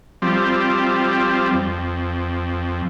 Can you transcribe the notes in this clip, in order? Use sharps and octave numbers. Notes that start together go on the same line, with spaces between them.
F3 G3 C4
F2